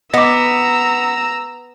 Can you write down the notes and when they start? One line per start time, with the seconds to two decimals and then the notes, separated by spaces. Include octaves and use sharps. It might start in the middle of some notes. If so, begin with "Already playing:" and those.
0.14 B3 D#5 A#5 D6 E6